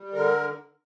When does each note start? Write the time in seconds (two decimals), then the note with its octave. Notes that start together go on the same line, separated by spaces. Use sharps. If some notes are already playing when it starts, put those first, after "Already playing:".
Already playing: G3
0.13 D3 A#4